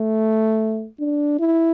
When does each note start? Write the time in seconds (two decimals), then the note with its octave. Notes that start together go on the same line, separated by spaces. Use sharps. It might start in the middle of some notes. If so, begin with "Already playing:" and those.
Already playing: A3
1.00 D4
1.40 E4